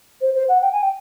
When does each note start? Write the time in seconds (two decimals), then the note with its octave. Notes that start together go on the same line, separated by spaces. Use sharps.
0.21 C5
0.34 C5
0.48 F#5
0.61 G5
0.72 G#5
0.82 G5